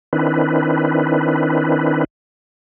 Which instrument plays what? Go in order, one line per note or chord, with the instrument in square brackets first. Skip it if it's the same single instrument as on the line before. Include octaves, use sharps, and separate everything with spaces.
[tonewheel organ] D#3 C4 D4 E4 B4